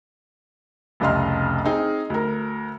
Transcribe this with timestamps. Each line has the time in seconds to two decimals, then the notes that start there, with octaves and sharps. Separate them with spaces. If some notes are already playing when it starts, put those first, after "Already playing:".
1.00 F1 C2 C#3 D#5 C6 F6
1.65 C4 D#4 G#4
2.10 D2 A#4